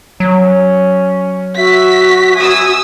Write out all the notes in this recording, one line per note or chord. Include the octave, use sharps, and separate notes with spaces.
F#3 C#4
F#4 E5 B6
E5 G#5 D#6 E6